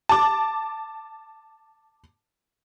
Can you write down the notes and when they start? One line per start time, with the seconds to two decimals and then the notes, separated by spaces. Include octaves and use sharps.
0.09 A5 D6